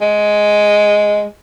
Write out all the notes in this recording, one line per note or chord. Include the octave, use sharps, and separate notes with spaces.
G#3